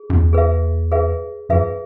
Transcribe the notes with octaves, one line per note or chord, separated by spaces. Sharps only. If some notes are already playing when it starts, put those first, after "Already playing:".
Already playing: G#4
F#2
E2
G#4 B4 E5
G#4 B4 E5
F#2 G#4 B4 E5